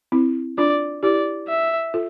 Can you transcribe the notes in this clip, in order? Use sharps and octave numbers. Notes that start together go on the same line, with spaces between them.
C4 E4
D4 F4 D5
E4 G4 D5
E5
F4 A4